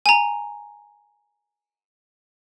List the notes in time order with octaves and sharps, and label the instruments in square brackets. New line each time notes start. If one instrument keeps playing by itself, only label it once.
[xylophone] G#5 A#5